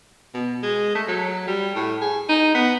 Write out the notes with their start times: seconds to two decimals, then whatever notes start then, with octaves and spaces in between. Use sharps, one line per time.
0.34 B2
0.63 G#3
0.95 A3
1.08 F#3
1.47 G3
1.75 A2
2.01 G#4
2.29 D#4
2.55 B3